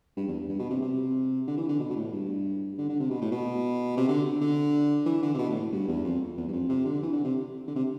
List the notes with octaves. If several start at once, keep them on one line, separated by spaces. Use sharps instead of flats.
G2
E2
G2
B2
C3
C3
D3
E3
D3
B2
B2
A2
G2
D3
D3
C3
B2
A2
B2
C3
D3
D3
E3
D3
C3
B2
A2
A2
G2
E2
F2
E2
G2
F2
C3
D3
E3
D3
C3
D3
C3